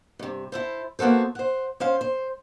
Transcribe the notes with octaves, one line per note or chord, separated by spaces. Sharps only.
G2 C3
E4 A4 C5
A#3 B3 F#4 A4 C5
C5 F#5
C#4 C5 F5
C5